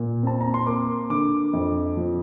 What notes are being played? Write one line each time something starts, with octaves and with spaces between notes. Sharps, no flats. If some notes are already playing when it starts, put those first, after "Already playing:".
Already playing: A#2
C4 A5
A#5
C6
A#3 D6
D3 D6
F2
F3